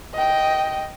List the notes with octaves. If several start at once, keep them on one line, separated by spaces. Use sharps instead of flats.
D#5 G5